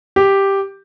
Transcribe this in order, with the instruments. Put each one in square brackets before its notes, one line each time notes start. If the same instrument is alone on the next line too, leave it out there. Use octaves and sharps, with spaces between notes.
[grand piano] G4